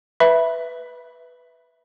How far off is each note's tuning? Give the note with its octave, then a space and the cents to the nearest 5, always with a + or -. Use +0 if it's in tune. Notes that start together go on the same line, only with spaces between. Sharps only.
B4 +0 E5 +0 B5 -15